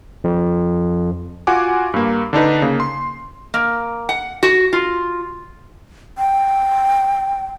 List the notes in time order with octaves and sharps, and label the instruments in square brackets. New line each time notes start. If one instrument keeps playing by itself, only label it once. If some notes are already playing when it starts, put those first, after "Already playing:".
[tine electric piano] F2
[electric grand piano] F4 F#4 F#5 G#5 D6
G2 A#3
D3 D4 D#4 B4
C#3 A#3
C6
[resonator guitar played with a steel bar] A#3
F#5
F#4
F4
[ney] G5